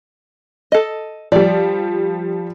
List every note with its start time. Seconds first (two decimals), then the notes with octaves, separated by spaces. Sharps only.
0.72 A4 D#5
1.32 F3 G3 D5